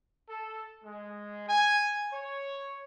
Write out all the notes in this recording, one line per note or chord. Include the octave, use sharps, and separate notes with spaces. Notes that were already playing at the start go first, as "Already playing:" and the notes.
A4
G#3
G#5
C#5